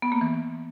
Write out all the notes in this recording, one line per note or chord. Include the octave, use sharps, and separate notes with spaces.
B3
A#3
E3